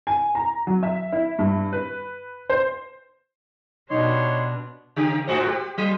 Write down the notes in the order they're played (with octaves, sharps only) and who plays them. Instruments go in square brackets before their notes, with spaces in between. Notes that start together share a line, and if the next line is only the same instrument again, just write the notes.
[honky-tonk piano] G#5
A#5
F#3
E5
E4
G2
B4
C5
[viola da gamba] B2 D4 [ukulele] D#4 G4 D#5 [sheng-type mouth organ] C#5 C6
[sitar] C#3 G4
G#2 F#4 C5
G4
F#3